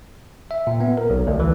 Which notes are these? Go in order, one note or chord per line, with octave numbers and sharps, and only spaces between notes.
E5
A#2
B3
A#4
B1
D2
E3